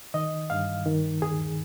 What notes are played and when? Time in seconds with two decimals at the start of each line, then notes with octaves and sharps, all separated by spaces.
0.14 D#3 D#5
0.50 G2 F5
0.86 D#3
1.21 D#2 G#4